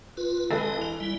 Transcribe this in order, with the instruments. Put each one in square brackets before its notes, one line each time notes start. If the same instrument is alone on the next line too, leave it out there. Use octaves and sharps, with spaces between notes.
[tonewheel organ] F4 B4
[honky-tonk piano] F1 G#3 B4 [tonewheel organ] D#5
[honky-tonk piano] E3 F7
[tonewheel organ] G3 E4